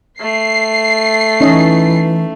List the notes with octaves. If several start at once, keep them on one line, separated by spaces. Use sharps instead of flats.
A3 C7
E3 C#4 D#4 D#5